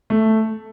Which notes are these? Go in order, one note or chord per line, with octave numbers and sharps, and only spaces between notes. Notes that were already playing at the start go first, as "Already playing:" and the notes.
A3